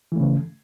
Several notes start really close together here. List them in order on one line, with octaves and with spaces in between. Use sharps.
E3 A3 C#3